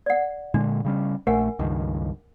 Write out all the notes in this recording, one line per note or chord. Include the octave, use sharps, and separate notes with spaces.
D5 F#5
A#2 D3 G#3 D4
C#3 G3 C#4
A#1 A3 A#4 F#5 G#5
C#2 G2 D#3